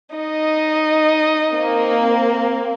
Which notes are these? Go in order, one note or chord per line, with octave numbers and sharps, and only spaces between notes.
D#4 D#5
A#3 C4